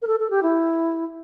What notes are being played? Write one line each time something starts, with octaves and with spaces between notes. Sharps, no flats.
A#4
A4
A4
G4
E4